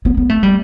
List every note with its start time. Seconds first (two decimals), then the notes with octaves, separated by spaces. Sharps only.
0.05 B3
0.17 B3
0.29 A3
0.43 G3